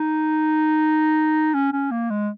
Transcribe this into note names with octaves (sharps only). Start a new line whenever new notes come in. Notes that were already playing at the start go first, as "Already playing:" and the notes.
Already playing: D#4
C#4
C#4
A#3
G#3